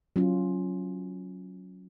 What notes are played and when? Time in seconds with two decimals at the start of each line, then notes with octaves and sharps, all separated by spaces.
0.16 F#3 C#4 F4